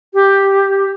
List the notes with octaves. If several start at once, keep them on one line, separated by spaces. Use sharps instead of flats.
G4